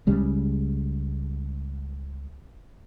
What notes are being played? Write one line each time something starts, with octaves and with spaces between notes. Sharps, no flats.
C#2 C#3 G3 G#3